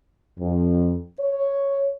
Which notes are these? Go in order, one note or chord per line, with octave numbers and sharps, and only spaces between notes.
F2
C#5